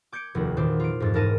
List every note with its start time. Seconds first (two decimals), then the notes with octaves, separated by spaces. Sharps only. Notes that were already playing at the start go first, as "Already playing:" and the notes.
0.12 D6 G6 G#6 C#7 D7
0.35 F1 D#2 F#4
0.57 E2 A#2 D#3 C5 D6
0.80 F4 D7
1.00 F2 G#2 A6
1.14 E1 G#2 A#4 A5 A#6 D#7